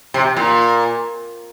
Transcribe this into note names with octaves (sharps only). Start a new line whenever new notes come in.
C3
A#2